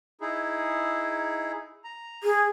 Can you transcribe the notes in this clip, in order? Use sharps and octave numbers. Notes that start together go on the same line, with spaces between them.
D#4 E4 G#4
A#5
G#4